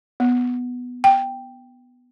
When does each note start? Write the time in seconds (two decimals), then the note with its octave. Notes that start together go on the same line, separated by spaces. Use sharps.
0.20 B3
1.04 G5